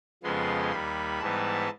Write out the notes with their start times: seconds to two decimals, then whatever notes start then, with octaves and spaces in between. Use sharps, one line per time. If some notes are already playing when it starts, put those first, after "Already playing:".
0.23 F2 C#3 F3 G#3 B3 C6
0.72 D#2 D#3 G3 B5
1.20 G#2 E3 G3 B3 A5